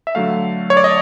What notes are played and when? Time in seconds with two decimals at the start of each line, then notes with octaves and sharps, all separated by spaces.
0.07 E5
0.15 D3 F#3 A3 F5
0.70 C#5
0.77 D5
0.84 D#5